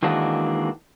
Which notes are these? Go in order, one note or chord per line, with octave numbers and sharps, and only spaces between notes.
D#3 E3 G#3 A#3 D4 F#4